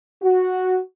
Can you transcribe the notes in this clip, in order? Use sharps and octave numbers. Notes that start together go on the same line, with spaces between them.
F#4